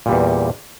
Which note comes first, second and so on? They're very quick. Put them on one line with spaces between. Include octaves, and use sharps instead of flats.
A#2 G3 E2